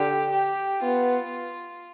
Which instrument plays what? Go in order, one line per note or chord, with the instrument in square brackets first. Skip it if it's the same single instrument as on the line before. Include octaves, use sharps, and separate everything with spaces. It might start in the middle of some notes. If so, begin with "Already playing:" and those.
Already playing: [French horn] D3 [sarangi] G4
[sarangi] G4
[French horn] B3 [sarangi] F4